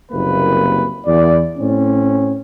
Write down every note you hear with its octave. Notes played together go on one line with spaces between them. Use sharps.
F#1 C2 C3 A#3 B4
E2 D5
A2 C4 C#4